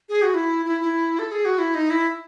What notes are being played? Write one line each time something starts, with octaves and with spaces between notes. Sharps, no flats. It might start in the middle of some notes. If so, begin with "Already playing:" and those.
G#4
F#4
E4
E4
E4
A4
G#4
F#4
E4
D#4
E4